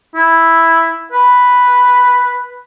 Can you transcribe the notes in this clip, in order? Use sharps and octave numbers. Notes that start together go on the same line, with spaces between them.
E4
B4